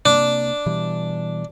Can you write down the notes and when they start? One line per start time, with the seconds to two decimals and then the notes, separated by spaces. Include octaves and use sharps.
0.06 C3 A#3 D4
0.66 B2 E3 G3